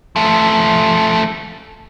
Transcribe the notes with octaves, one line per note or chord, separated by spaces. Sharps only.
F3 A3